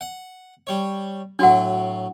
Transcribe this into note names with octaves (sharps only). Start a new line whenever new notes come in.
F#5
G3 C#5
A2 F#3 D4 F#4 F#5